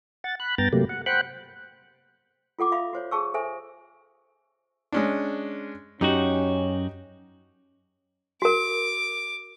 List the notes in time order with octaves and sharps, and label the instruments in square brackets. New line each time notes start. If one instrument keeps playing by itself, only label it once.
[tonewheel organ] F#5 A6
B5 F#6
G2 B3 G5 A#5 A6
C3 F#3 A3 A#3 G4
F#5
C5 F#5 G5 B5 F#6
[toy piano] F4 A4 F#5 D6
E5 F5 B5
F#4 C5 C#5
G#4 A5 C#6 E6
A4 C5 E5 G#5
[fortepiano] G#3 C#4 D4
[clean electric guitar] F#2 F#4 [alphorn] C#4 [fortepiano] D#4 G4
[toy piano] F#4 A#4 [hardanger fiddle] D6